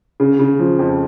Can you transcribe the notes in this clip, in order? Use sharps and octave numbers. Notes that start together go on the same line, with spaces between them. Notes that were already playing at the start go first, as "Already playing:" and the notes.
C#3
C#3
F3
F2